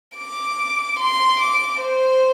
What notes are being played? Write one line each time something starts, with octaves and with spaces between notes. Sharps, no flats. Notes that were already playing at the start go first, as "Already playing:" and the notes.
D6
C6
D6
C5